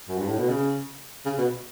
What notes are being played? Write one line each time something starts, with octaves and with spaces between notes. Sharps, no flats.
F#2
G2
A2
B2
C#3
C#3
B2